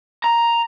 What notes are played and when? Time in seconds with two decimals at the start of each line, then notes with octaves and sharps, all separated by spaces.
0.24 A#5